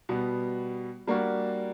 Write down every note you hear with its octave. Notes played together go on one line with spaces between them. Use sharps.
B2 G3 B3
G3 A#3 D4 F#4